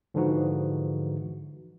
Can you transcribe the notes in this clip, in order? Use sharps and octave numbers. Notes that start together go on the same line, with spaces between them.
G#2 D3 E3 F3 D#4 F#4